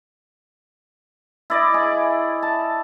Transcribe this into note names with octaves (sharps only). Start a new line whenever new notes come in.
E4 D5 D#5
G#4
A5